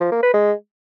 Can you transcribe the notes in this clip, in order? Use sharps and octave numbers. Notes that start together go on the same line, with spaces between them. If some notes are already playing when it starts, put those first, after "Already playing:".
F3
A#3
B4
G#3